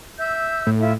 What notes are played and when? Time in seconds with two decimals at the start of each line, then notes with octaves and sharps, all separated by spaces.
0.19 E5 E6 G6
0.67 A2
0.79 E4 F4 E5